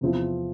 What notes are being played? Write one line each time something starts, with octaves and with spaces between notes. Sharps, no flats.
E2 C3 F3 C4 E4